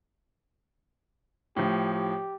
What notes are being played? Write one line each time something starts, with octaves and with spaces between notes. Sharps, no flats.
A2 F3 G4
G4